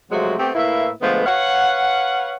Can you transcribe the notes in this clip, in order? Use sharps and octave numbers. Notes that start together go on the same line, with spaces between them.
C3 F3 F#3 G#3 A3 F#4
A3 B3 C4 G4
A2 A#3 E4 B4 E5
D3 F3 G#3 A3 B3
B4 C#5 F5 F#5